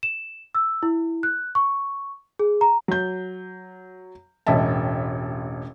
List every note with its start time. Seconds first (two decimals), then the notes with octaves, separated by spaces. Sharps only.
0.03 E7
0.55 E6
0.83 E4
1.23 F#6
1.55 C#6
2.39 G#4
2.61 A#5
2.88 F#3 G6
4.47 E1 A1 D#5 E5 A5